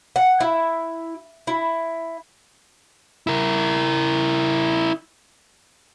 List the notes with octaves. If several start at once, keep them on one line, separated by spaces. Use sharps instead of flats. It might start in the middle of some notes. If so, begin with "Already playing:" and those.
F#5
E4
E4
E4 A#4